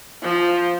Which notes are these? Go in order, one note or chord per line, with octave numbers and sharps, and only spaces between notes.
F3